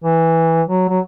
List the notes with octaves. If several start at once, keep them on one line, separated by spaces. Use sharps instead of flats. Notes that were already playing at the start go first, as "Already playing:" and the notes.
E3
F#3
F#3